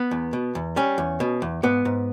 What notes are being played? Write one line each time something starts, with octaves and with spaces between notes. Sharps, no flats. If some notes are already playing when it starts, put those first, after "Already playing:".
Already playing: B3
E2
B2
E2
G3 C#4
E2
B2
E2
G#2 B3
G#2